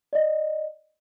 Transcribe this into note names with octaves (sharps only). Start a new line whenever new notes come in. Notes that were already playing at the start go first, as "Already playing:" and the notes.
D5 D#5